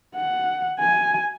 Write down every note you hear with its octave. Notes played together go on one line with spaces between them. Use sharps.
F#5
G#5